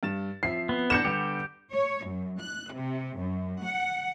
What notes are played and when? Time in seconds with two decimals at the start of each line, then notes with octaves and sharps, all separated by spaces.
0.03 G2 A6 E7
0.43 F3 C4 E5 C7
0.69 B3
0.90 E3 D4 D6 G6 A#6 C#7 E7
1.05 D3 G3 B3 G4
1.72 C#5
2.06 F#2
2.40 F#6
2.73 C3
3.18 F#2
3.64 F#5